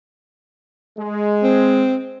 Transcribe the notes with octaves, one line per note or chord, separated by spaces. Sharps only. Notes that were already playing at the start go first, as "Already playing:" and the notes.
G#3
C4